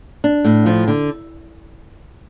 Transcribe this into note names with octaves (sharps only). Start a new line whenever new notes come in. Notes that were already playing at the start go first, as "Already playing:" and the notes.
D4
A2
F3
D3